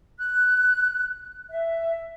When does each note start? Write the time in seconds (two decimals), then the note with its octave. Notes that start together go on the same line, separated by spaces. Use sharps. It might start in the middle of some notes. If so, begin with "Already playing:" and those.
0.17 F#6
1.49 E5